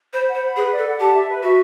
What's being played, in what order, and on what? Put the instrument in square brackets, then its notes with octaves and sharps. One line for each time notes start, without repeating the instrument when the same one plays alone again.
[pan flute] C5 [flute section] B5
[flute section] F#5
[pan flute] C5
[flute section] B5
[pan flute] G#4 [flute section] B4
[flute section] D5
[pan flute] A4
[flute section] F#5
[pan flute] G4 [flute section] A5
[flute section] E5
B4
[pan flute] F#4 [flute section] E5